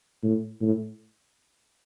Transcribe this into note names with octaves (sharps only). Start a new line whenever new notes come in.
A2
A2